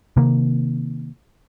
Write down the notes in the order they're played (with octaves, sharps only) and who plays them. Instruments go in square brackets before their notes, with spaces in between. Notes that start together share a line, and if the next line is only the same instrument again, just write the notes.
[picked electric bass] C3 D#3 A#3